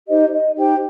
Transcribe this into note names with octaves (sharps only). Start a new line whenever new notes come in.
D#4 G4 C5 D#5
D#5
D#4 G4 C5 G5